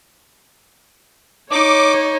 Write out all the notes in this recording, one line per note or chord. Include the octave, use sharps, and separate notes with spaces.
D#4 C#5 D6